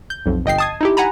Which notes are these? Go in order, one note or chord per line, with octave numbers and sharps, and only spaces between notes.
G6
B1 F2
G1 D#5 G5 C7
A5 D#6 G#6
D#4 E4 G4
F#5 G#5 A#5 B5